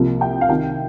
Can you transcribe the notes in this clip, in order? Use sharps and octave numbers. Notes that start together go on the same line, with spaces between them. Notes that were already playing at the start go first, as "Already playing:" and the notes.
Already playing: C2 C3 F3 A#3
G5
F5
C2 C3 D#3 G5